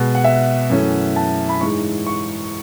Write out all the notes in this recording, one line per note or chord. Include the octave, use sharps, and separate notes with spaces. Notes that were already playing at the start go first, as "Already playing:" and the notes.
Already playing: B2 G#3 B3
F#5
E5
F#2 E3 A3 C#4
A5
B5
G#2 E3 G#3 C#6
C#6